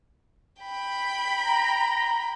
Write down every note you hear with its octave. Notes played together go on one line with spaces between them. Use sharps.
G5 B5
A#5